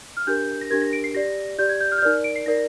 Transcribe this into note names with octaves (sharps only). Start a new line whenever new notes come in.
F6
D4 G4 A#4 G6
A#6
D4 G4 A#4 G#6
A#6
D7
C7
G4 D5 A#6
G4 D5 G6
G#6
G6
F6
G6
D#4 A#4 D5 F6
D7
C7
D#4 A#4 D5 A#6